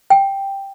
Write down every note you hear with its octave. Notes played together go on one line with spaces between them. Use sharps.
G5